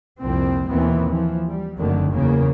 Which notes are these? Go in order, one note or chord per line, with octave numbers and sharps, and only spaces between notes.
C2 F2 A#2 F3 C4
D#2 B2 E3 B3 C4
E3 F3
G3
F#1 F2 D3 D#3 F#3 A3
E2 C#3 A#3